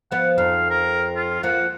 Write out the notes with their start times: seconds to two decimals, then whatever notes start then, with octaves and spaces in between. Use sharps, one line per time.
0.12 F3 B3 F#5
0.38 F2 D#4 F5
0.70 A#4
1.15 F4
1.43 F3 A#3 F#5